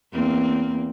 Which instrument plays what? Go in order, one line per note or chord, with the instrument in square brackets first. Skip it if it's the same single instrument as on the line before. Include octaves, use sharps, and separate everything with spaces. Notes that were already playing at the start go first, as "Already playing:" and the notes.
[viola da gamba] E2 A#3 C4